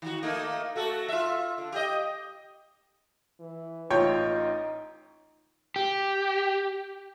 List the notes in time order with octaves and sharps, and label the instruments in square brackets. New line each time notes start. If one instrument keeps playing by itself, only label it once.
[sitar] D#3 F#4
A3 A#3 D#4
A3 F#4 A4
F4 E5
D3
G4 D#5
[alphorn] E3
[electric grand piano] A1 F4 [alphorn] D#4 [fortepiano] C#5 G5
[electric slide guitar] G4